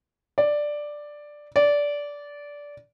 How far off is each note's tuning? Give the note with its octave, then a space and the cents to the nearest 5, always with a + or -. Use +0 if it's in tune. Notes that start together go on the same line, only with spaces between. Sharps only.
D5 +5
D5 -15